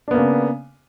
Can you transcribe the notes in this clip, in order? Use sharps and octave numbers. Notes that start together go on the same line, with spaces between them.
C#3 A#3 B3 D4